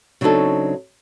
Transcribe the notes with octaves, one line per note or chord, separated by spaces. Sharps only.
C#3 F#3 C4 D4 D#4 A4